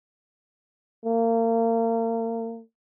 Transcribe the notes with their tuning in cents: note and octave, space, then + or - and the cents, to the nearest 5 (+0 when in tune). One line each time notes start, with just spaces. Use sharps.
A#3 -35